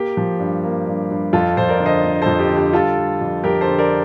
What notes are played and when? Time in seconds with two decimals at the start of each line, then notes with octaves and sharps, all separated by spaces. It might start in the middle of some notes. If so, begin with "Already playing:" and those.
Already playing: A#3 G4
0.17 F3
0.39 G2
0.63 A#3
0.87 G2
1.11 G2
1.33 F2 F4 A4
1.57 F2 C5
1.68 A#4 D5
1.80 D3
1.86 C5 D#5
2.04 D3
2.22 F2 A4 C5
2.39 G4
2.50 D3
2.57 G4
2.73 G3 F4 A4
2.97 G3
3.21 F2
3.44 F2 G4 A#4
3.61 A4 C5
3.67 D3
3.79 A#4 D5